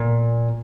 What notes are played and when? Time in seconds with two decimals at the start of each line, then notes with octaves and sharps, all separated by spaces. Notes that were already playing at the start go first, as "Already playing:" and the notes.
Already playing: A#2